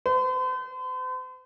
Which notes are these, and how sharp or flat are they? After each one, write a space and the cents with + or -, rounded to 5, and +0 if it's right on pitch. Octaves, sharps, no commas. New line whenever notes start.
C5 -45